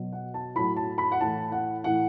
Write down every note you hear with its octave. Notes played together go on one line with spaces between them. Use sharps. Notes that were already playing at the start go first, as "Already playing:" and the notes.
Already playing: B2 F#3
F#5
A5
A2 F#3 B5
A5
B5
F#5
A2 E3 A5
F#5
A2 E3 F#5